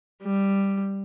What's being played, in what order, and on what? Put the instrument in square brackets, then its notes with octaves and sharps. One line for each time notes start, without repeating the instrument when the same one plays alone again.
[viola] G3